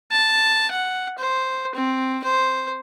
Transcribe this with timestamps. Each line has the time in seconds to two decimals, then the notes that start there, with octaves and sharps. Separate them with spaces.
0.11 A5
0.71 F#5
1.18 C5
1.75 C4
2.24 C5